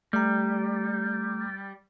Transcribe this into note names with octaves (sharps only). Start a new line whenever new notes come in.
G3 A3 A#5